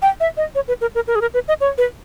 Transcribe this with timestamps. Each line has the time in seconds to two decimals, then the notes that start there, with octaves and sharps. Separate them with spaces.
0.02 G5
0.20 E5
0.37 D#5
0.55 C#5
0.68 B4
0.81 A#4
0.95 A#4
1.08 A#4
1.15 G#4
1.21 A#4
1.34 B4
1.48 D#5
1.61 C#5
1.78 B4